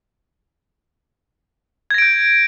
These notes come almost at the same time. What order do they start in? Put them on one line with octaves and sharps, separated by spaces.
G#6 A#6 D7 G6